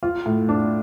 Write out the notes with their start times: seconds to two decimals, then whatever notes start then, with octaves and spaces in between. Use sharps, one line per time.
0.03 F4
0.26 A2
0.49 D4